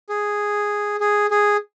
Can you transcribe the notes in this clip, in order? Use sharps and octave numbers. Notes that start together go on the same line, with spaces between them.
G#4
G#4
G#4